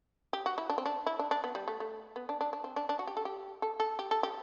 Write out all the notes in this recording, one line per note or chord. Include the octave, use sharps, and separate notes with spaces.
G4
F#4
E4
D4
C4
D4
E4
D4
D4
B3
G3
A3
A3
B3
D4
D4
D4
C4
D4
D4
F#4
G4
A4
G4
A4
A4
G4
A4
G4